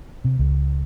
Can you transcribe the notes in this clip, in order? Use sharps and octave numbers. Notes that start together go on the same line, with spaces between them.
C3
C#2